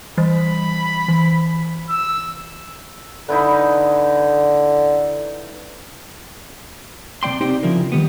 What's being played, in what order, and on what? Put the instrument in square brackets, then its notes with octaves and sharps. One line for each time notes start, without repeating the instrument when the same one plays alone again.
[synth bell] E3 G3 [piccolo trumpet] B5
[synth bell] E3
[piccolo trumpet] E6
[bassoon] D3 [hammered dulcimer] D#4 E4 B4
[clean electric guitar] C3 A#3 D5 G5 C6
C4 D#4 G4 C5 D5 G5
C#3 F3 E4 F4 A#4
D#3 G3 B3